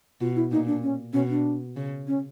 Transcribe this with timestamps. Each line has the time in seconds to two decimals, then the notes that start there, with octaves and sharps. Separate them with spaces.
0.21 B2 F4
0.36 E4
0.51 A#2 D#4
0.67 D4
0.82 C#4
1.13 B2 C#4
1.29 D4
1.76 C#3
2.07 C#4